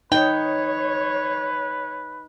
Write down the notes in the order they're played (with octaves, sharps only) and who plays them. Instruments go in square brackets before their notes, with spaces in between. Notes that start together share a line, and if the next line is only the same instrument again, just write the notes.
[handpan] D#4 D#5 [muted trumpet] B4 [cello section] C#5 [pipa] G5